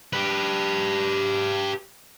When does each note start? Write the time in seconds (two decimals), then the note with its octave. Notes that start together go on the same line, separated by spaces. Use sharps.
0.13 G4 B4